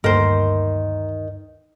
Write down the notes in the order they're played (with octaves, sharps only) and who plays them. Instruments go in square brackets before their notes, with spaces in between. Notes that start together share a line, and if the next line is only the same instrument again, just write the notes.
[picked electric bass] D2 G2 A#3 [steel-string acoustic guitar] D#3 [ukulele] A#4 C5